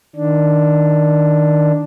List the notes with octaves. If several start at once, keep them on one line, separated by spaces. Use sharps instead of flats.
D#3 D4